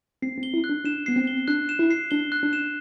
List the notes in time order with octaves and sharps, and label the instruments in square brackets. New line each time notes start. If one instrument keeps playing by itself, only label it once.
[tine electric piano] C4 [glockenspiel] C7
[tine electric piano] C4
[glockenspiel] G7
[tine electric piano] E4
[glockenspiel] F#6
[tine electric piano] D4
[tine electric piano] D4 [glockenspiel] E7
[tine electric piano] B3 [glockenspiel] C7
[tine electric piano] C4
[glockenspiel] G7
[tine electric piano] D4 [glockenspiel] F#6
[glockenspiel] E7
[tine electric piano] E4
[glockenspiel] C7
[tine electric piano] D4 [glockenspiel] G7
[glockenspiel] F#6
[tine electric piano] D4
[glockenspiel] E7